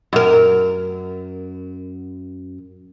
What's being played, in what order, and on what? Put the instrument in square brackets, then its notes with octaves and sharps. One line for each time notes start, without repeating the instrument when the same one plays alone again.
[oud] F#2 A#4